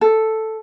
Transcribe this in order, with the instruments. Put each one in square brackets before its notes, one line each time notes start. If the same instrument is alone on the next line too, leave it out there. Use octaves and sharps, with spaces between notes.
[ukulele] A4